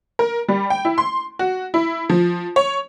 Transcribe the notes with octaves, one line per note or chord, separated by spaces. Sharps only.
A#4
G3
G5
E4
C6
F#4
E4
F3
C#5